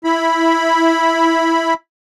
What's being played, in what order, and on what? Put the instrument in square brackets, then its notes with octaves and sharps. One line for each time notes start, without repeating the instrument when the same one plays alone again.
[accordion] E4 B5